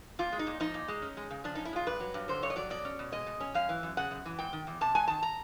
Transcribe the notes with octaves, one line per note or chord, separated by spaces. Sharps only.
A#2 F4
G#3
D#4
A#2
F3 D#4
A#2
G#3
C#4
G#3
C#3
F3 D4
C#4 D#4
E4
G#3 F4
G2 B4
F#3
G2
D3 C5
G2 C#5
D#5
F#3 D5
B2 D5
C#4
B2
G#3 D#5
B2
C#4
F#2 F5
E3
F#2
C#3 F#5
F#2
E3
G#3 G5
D#3
E2
C3 A5
G#3 G#5
D#3 A5
A#5